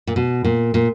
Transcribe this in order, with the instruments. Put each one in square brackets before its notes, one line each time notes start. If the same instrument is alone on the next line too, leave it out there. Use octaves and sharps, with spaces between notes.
[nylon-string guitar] A#2
B2
A#2
A#2